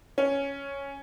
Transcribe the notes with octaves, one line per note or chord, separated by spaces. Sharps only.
C#4